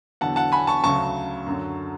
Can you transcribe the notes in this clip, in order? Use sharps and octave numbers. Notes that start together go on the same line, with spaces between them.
E2 D3 F#3 F#5 A5
F#5 A5
G#5 B5
A5 C#6
D2 C#3 F#3 A5 C#6
F#2 D3 F#3